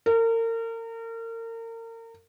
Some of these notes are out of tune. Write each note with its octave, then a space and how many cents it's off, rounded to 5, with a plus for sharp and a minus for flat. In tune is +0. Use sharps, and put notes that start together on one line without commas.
A#4 -35